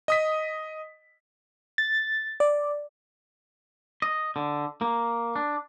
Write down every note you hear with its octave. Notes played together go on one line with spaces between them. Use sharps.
D#5 D#6 B6
A6
D5
D#5
D3
A#3
D4